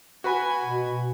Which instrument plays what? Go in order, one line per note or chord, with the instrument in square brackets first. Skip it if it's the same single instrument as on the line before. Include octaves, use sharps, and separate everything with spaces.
[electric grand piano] F#4 B4 B5 [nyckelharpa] G#5
[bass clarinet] B2